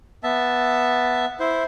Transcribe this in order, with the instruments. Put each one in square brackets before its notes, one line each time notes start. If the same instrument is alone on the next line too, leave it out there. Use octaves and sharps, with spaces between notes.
[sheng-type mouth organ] B3 E5 A5
E4 C5